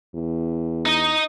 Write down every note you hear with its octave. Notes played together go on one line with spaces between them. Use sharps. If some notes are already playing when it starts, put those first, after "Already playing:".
E2
D#4 D#5